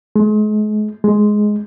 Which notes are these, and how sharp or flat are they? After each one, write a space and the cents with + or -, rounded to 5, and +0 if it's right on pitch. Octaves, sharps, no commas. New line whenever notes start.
G#3 +40
G#3 +10